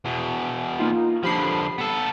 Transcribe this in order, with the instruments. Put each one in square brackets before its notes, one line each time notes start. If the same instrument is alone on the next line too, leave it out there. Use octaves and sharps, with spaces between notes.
[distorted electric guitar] E2 B2
[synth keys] A#3 D#4 F4
[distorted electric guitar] D3 F3 [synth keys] G4 B5 C7
[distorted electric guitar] B3 A4